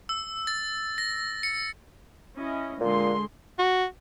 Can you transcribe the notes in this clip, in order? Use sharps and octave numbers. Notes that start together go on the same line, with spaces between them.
E6
A6
A#6
C#7
C#4 E4 D#5
A#2 D3 G#3 C6
F#4